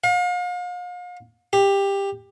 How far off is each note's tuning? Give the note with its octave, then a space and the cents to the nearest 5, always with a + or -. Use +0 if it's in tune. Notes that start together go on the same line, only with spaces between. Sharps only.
F5 +40
G4 +15